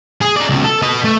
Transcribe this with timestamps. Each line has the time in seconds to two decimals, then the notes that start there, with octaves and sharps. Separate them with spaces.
0.21 G#4
0.36 D#4 D5
0.49 C#2 B2
0.64 A4
0.83 B4 D#5
1.04 A3